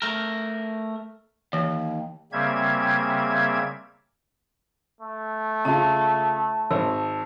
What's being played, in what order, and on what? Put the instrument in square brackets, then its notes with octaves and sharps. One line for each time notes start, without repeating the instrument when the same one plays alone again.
[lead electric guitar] A3 A#4
[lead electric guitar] D#2 [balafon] E3
[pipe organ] C#3 G3 A#3 C4 E5 G#6
[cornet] A3
[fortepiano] C#3 F4 [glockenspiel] A5
[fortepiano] G#1 [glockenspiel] E6